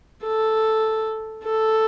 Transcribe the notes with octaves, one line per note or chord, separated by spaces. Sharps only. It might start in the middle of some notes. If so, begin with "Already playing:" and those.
A4
A4